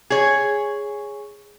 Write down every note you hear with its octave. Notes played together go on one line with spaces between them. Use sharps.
G#4 C#5